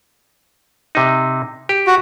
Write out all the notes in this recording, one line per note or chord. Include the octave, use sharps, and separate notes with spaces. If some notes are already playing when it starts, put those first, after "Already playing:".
C3 D#4
G4
F#4